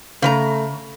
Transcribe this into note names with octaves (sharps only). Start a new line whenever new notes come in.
C#3 A3 B4 A#5